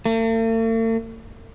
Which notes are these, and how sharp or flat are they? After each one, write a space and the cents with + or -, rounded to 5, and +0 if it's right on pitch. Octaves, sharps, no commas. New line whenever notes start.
A3 +45